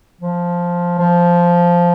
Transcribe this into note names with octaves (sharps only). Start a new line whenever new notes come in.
F3
F3